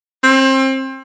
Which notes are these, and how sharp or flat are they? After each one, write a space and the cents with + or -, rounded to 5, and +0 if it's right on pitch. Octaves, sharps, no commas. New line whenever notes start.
C4 +30